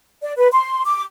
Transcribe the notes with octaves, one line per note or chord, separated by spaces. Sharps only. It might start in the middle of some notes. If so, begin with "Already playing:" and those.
D5
B4
C6
D6